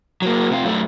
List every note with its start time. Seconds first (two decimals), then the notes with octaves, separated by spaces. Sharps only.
0.22 F#3 A#3
0.51 C3 F4
0.64 F#2 A3